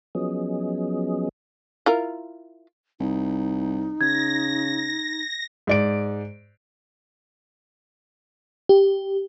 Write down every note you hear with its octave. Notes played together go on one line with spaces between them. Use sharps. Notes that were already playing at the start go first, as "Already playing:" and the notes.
F3 F#3 B3 C#4 G#4 D#5
E4 F4 A#4
C2 D#4
C#3 G#6 A#6
G#2 D5 D7
G4